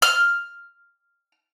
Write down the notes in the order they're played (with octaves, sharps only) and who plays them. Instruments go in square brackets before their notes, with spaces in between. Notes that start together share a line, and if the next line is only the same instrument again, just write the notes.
[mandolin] F6